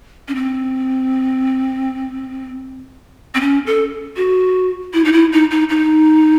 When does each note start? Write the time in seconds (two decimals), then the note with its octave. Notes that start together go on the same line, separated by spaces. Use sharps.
0.28 C#4
0.35 C4
3.34 C4
3.40 C#4
3.66 A4
4.16 F#4
4.93 E4
5.04 D#4
5.12 E4
5.32 D#4
5.50 D#4
5.69 D#4